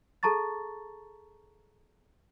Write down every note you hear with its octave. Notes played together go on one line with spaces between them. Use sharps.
G#4 A4 A5 A#5 C#6 A6